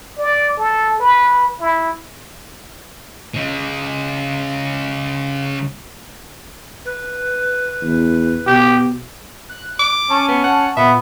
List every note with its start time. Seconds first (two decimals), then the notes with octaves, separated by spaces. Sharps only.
0.18 D5
0.58 A4
1.00 B4
1.61 E4
3.34 C#3 G#3
6.85 B4
7.82 E2
8.47 B2 G4
9.49 F#6
9.80 D6
10.10 C#4 A5
10.29 B3
10.44 F#5
10.77 A#2 B3 E5